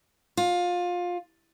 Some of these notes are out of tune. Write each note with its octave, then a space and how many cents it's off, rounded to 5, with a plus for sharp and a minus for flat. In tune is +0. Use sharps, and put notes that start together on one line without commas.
F4 +20